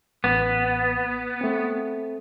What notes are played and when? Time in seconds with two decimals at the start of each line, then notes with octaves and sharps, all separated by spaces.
0.24 A1 B3
1.41 A3 C4